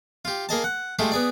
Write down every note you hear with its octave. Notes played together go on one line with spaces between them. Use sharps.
F4 G4
A#3 G#4 D#5 A5
F#5
G#3 A3 E4 F4 G4
B3 G#4 D5